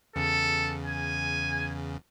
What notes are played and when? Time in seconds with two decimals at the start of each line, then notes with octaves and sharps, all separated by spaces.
0.16 E2 C#3 A4
0.86 G#5